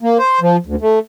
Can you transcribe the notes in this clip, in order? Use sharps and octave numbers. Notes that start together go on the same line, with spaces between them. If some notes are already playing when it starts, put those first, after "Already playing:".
A#3
C5
F3
D2
A3